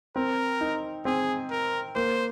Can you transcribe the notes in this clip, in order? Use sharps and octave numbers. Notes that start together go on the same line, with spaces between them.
C4 A#4
D#4
C4 G#4
A#4
A#3 C5